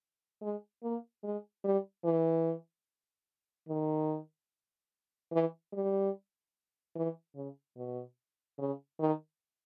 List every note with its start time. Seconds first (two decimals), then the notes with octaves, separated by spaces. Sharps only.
0.42 G#3
0.83 A#3
1.23 G#3
1.64 G3
2.05 E3
3.69 D#3
5.32 E3
5.73 G3
6.95 E3
7.35 C#3
7.77 B2
8.59 C#3
8.99 D#3